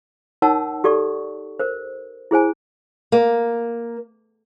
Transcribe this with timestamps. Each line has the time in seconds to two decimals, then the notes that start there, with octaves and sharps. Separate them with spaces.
0.42 D#4 A#4 C#5 F#5 A5 E6
0.84 G4 A4 D5 C#6
1.59 A#4 C5
2.31 E4 G#4 C5 G#5
3.12 A#3